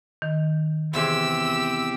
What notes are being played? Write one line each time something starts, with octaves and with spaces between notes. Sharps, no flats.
D#3
E2 C3 C4 G4 E5 E6